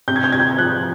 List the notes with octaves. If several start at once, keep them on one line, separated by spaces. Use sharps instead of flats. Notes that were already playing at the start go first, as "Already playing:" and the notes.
C3 G6
G#6
G6
C3 G#6
G6
F3 F#6